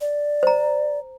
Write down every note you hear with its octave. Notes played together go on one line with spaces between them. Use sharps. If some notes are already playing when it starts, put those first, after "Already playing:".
D5
C5 A#5